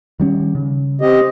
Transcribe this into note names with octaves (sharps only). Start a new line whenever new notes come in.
D#3 G3 C#4
C#3
C4 G4 D#5